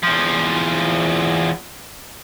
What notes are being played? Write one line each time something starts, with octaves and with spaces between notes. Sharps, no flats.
E2 F3